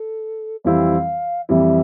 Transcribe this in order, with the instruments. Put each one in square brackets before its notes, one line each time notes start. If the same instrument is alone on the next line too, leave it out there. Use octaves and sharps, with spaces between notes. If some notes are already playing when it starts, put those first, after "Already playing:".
Already playing: [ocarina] A4
[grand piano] F2 E3 G3 C4 E4 [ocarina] F5
[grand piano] F2 E3 G3 C4 E4 [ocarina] E5